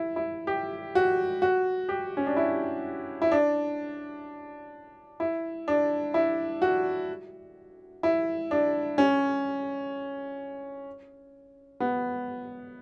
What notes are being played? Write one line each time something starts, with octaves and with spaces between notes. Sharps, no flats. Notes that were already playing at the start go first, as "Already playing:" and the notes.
Already playing: E4
E4
G4
F#4
F#4
G4
C#4
D4
E4
E4
D4
E4
D4
E4
F#4
E4
D4
C#4
B3